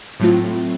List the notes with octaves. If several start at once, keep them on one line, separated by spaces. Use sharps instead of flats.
A2 F#3 A3 C4 F4